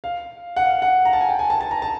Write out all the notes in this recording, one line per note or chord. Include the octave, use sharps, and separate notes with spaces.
F5
F#5
F5
F#5
A#5
A5
G#5
G5
G#5
A5
A5
A#5
A5